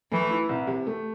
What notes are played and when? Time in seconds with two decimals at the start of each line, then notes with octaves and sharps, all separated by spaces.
0.11 E3 A3
0.31 E4
0.49 C2
0.67 C3
0.87 A3